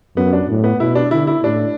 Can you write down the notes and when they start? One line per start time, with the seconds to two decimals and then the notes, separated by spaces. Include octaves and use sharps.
0.17 F#2 B3
0.33 D4
0.49 A2
0.64 B3
0.80 B2 E4
0.95 D4
1.11 D3 E4
1.27 E4
1.43 A2 D4